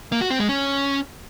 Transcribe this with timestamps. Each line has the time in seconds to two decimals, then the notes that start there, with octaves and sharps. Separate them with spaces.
0.12 A#3
0.21 F#4
0.30 C4
0.40 G#3
0.49 C#4